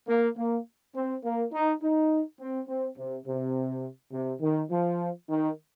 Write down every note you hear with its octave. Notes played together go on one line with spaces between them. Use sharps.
A#3
A#3
C4
A#3
D#4
D#4
C4
C4
C3
C3
C3
D#3
F3
D#3